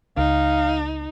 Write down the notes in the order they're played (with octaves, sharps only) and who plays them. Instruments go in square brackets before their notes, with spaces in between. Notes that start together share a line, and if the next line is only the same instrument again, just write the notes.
[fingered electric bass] C#2 [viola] D#4 [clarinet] F5